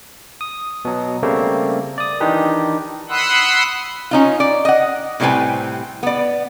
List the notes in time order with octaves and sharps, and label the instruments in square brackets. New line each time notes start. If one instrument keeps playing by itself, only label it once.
[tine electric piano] D#6
B2 F#3
C#3 G3 A3 A#3 C4
D5 D#6
D#3 E3 D4 D#4 G4 B4
[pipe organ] F#5 B5 C6 D#6 E6 F#6
[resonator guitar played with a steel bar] C#4 D#4 F4
D5
D#5 F#5
A2 C3 G3 C4 B4 G#5
B3 D5